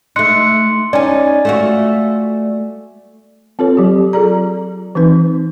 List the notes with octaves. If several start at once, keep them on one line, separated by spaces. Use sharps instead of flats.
A3 D#4 C6 F#6 C#7
C#4 D#4 D5 G#5
A3 F4 F#4
C4 F4 A4 B4 C#5
F#3 G4
F4 G#4 A4 D5 A#5
E3 C4 D#4 B4